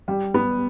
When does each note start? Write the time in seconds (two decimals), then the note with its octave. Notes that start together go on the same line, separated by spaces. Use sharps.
0.08 G3
0.34 B3